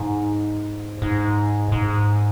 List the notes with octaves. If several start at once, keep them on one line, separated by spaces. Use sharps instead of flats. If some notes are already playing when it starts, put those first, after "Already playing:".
Already playing: G#2
G#2
G#2